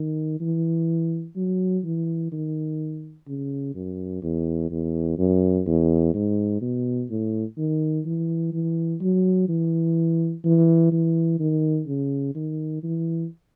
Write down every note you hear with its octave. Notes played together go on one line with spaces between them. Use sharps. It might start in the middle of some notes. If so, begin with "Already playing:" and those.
Already playing: D#3
E3
F#3
E3
D#3
C#3
F#2
E2
E2
F#2
E2
G#2
B2
A2
D#3
E3
E3
F#3
E3
E3
E3
D#3
C#3
D#3
E3